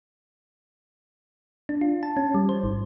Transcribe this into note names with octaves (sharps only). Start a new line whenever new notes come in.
D4
F4
A5
C#4
G3
C5
G#1